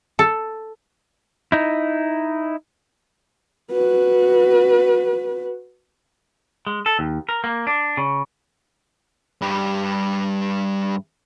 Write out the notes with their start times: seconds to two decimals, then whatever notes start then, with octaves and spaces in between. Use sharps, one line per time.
0.19 A4
1.52 D#4 E4
3.71 F#4 B4
6.67 G#3
6.86 A4
6.99 D#2
7.29 A#4
7.44 A#3
7.67 D4
7.97 C#3
9.42 G2 G3